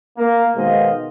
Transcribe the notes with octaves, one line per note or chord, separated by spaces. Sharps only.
A#3
B2 D#3 G#3 C5 D#5 F5